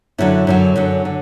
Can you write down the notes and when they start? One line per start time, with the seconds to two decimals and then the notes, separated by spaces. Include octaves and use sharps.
0.18 F#2 D3 F#3 E4
0.47 F#2 D3 F#3
0.76 F#2 D3 F#3
1.05 D3